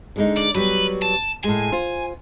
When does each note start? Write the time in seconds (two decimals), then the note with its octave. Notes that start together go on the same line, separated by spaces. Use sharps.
0.16 D3 G#3 D#4
0.37 D5
0.55 F#3 G3 B3 B4
1.02 A5
1.44 A2 G#3 G#5
1.72 F4 C5